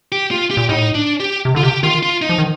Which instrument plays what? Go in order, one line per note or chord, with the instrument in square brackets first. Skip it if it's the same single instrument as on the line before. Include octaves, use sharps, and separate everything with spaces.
[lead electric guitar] G4
F4
G4
[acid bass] A#2
[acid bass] A2 [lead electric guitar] D#4
[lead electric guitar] D4
G4
[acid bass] C3
[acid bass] D3 [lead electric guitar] F4
[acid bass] C3 [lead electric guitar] G4
[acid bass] D#3 [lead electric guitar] F4
[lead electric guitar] F4
D#4
[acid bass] F3
D#3